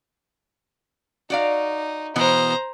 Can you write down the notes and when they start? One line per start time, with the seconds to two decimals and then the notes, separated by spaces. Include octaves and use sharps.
1.30 D#4 F#4 D5 F5
2.16 B2 E3 B3 C5 A#5